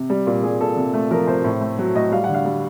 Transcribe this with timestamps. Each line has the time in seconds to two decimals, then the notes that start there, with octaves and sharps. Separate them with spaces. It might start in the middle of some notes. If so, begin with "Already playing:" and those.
Already playing: C3
0.10 G3
0.27 A#2
0.44 G3 G#4
0.61 A#2 A4
0.77 C3
0.94 A3
1.11 F3 A#4
1.27 C3 C5
1.44 A2
1.61 A3
1.79 F#3
1.95 A2 D#5
2.12 G3 F5
2.24 F#5
2.29 D3
2.34 F5
2.45 G3